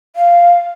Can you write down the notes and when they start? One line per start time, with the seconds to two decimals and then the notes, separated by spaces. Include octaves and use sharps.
0.16 F5